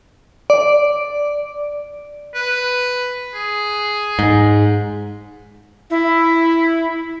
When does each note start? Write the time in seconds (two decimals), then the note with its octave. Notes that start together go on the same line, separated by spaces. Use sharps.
0.50 D5
2.35 B4
3.34 G#4
4.19 G#2
5.90 E4